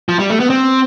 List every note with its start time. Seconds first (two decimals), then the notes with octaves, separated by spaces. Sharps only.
0.09 F3
0.19 G3
0.30 A3
0.40 B3
0.50 C4